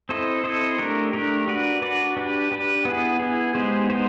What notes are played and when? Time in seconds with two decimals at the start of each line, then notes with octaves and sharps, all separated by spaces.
0.09 C4 E4 A4 C5 D#5
0.44 C4 E4 A4 C5 D#5
0.78 A3 D4 G4 A#4
1.13 A3 D4 G4 A#4
1.48 D4 F#4 B4 D5
1.82 D4 F#4 B4 D5
2.17 D4 G4 B4
2.51 D4 G4 B4
2.85 B3 E4 G#4
3.20 B3 E4 G#4
3.55 G#3 B3 D#4 G4 C5
3.90 G#3 B3 D#4 G4 C5